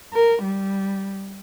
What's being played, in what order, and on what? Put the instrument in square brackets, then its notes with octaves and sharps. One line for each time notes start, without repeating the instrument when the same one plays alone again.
[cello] A#4
G3